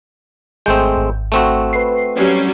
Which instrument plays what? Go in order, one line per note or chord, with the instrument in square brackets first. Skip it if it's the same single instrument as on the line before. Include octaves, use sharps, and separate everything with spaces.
[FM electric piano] G#1 G6 [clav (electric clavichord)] G#3 A3 C4
[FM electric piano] G#1
[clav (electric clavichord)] A3 C4 F#4
[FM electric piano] B4 C7
[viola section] F#3 G3 C#4